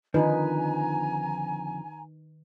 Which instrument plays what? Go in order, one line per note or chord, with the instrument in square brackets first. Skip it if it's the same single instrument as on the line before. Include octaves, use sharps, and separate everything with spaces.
[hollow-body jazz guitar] F2 D3 F3 [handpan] D#3 D#4 B4 [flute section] G#5 A#5